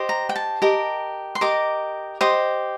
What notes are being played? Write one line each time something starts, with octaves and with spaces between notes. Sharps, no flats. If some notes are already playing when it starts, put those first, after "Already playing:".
Already playing: G4 C5 D#5
A#5
G5
A5
G4 A#4 D#5
C6
G4 A#4 D#5 D6
G4 C5 D#5 D#6